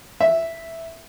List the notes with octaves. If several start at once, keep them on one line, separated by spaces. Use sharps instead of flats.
E5